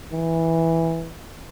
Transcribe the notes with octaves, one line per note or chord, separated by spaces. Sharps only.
E3